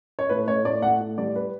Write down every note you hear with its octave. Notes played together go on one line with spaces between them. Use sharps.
C#5
A2 B4
A2 C#5
A2 D5
A2 F#5
A2
G3 D5
B4